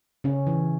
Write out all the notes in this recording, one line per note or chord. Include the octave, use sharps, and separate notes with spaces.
C#3 C#4
E3